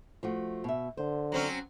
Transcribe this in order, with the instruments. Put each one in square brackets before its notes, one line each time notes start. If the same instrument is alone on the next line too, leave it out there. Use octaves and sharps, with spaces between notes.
[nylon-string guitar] F3 A3 F#4
B2 E5
[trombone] D3 [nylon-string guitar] C5
[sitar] F#3 C4 C#4